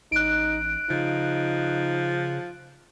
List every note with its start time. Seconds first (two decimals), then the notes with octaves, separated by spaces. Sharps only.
0.12 A1 D#4 F#6 D7
0.90 C#3 F3 D#4